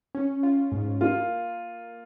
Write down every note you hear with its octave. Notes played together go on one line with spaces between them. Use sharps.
C#4
F4
G#2
A#3 F4